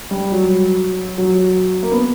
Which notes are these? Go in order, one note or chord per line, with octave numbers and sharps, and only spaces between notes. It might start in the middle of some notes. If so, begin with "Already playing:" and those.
G3
F#3
F#3
A#3
B3